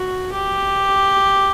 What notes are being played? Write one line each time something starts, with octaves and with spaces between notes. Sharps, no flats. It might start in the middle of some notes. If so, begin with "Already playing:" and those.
Already playing: F#4
G4